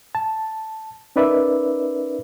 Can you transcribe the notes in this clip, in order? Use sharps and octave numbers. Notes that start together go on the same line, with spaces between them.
A5
C#4 D#4 A#4 B4 D5 E5